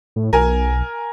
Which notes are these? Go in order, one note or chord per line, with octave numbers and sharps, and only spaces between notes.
A2
B1 A#4 G#5